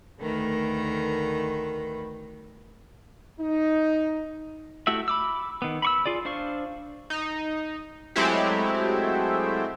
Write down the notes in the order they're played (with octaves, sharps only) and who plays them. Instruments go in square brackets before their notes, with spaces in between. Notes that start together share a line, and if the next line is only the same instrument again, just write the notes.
[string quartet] D2 D#3 A3 A#4 B4
[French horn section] D#4
[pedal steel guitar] A3 E4 F#4 G4 E5
B5 D6 E6
D#3 B3
B5 C#6 E6
F4 G#4 D5
D4 C5 F5 C#6
[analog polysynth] D#4
F#3 G#3 A3 C4 E4 G4